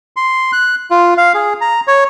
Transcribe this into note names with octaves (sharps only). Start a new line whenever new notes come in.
C6
F#6
F4
F5
G#4
A#5
C#5